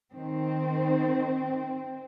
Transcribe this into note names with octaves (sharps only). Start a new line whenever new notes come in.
D#3 C4 C5